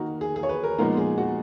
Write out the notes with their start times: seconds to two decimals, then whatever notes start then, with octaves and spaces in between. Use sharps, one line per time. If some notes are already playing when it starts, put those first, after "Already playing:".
Already playing: D#3 A#3 D#4 F#4
0.21 G#4
0.36 G#4
0.43 C#5
0.49 B4
0.64 A#4
0.78 A#2 F3 G#3 B3 D#4 A#4
0.97 G#4
1.18 F#4